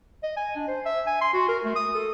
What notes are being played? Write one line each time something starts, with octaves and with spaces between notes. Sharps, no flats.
D#5
G#5
D4
C5
E5
G#5
C6
F#4
A#4
A3
D#6
A4